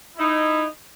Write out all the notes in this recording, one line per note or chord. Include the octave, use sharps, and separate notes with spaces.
D#4 E4